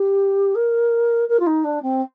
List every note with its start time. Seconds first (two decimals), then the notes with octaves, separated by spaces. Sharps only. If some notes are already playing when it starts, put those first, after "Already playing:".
Already playing: G4
0.55 A#4
1.28 A#4
1.39 F4
1.46 D#4
1.64 D4
1.82 C4